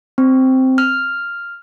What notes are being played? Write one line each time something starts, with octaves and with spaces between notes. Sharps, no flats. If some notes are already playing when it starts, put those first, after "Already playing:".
C4
F6